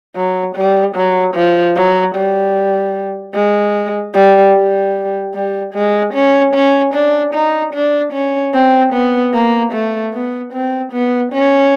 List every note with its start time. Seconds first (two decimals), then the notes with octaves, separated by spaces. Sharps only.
0.16 F#3
0.56 G3
0.96 F#3
1.35 F3
1.76 F#3
2.15 G3
3.35 G#3
4.14 G3
4.55 G3
5.34 G3
5.74 G#3
6.14 C#4
6.54 C#4
6.94 D4
7.34 D#4
7.74 D4
8.13 C#4
8.54 C4
8.94 B3
9.34 A#3
9.73 A3
10.14 B3
10.53 C4
10.93 B3
11.33 C#4